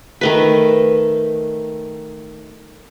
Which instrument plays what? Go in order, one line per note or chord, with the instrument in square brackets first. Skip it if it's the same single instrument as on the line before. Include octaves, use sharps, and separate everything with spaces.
[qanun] D#3 A3 B4